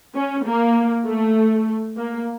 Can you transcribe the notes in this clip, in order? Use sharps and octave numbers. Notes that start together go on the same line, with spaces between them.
C#4
A#3
A3
A#3